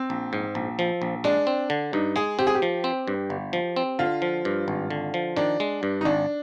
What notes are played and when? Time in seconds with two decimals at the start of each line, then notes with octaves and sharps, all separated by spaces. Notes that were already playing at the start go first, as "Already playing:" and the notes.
Already playing: C4
0.10 A#1
0.33 G#2
0.55 A#1
0.79 F3
1.02 A#1
1.24 G#3 D4
1.47 C4
1.70 D3
1.93 G2 D#4
2.16 G#3 G#4
2.39 C4 G4
2.47 G#4
2.55 G4
2.62 F3
2.84 C4
3.08 G2
3.30 G1
3.53 F3
3.76 C4
3.99 D3 F4
4.22 F3
4.45 G2
4.68 G#1
4.90 D3
5.14 F3
5.37 D#3 D4
5.60 G#3
5.83 G2
6.01 D#4
6.05 G#1 D4